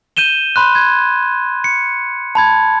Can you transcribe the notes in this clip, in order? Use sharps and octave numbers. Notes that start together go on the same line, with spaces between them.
G6 D#7 E7 G7
B5 C6 F#6
G#6
C#7
A5 B5 G#6